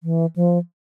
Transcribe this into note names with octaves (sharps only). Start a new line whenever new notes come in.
E3
F3